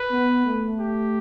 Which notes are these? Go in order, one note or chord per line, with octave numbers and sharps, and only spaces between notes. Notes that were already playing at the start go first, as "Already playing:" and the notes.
Already playing: B4
B3
A3
G4